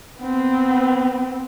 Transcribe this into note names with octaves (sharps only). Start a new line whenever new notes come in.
B3 C4